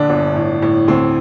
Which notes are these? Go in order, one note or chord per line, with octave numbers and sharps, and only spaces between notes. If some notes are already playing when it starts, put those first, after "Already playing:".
Already playing: A#1 D3 D4
G1
A2
A2
D2 C4